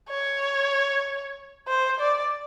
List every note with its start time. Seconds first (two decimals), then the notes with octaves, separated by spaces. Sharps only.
0.09 C#5
1.68 C5
2.00 D5